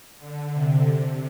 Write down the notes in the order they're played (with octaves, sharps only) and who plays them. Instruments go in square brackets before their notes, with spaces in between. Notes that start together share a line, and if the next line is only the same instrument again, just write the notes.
[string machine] D3
C3
C3